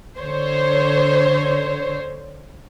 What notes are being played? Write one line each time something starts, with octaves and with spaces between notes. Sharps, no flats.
D3 C5 C#5